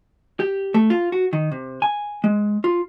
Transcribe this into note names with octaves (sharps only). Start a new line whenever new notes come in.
G4
A3
F4
F#4
D#3
C3
G#5
G#3
F4